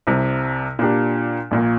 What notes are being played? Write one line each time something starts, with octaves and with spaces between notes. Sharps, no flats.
C2 C3 G3
A#2 A#3 D4 G4
A#1 A#2 A#3